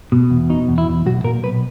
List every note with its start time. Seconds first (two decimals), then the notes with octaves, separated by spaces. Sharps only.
0.12 B2
0.30 E2
0.50 B2 D#4
0.68 E2
0.78 E4
0.87 E2
1.06 B1 F#4
1.24 A#2 A#4
1.43 B1 B4